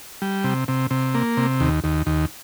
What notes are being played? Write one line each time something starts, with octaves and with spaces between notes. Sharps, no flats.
G3
C3
C3
C3
A#3
C3
D#2
D#2
D#2